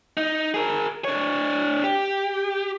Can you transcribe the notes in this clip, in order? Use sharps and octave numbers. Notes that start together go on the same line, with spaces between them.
D#4
G#4 A#4
D4 C#5
G4